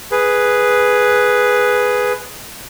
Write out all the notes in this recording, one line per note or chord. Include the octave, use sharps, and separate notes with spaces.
G#4 B4